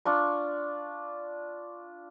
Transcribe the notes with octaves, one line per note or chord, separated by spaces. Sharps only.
D4 F4 C#6